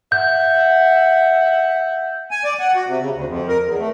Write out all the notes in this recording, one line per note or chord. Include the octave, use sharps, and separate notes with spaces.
E5 F#5 G6
G#5
D5
F#5
F#4
C3
C#3
D2
F2
A#4
E2
A3